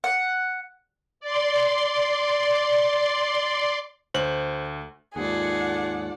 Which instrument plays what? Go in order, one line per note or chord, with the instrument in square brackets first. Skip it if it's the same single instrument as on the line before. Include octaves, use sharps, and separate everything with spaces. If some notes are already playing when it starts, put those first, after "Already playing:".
[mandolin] F#5
[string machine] D5 C6
[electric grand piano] D2 [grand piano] C5 F#7
[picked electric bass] D#2 G#2 [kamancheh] A3 D5 [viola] F4 F#5 [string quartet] G#4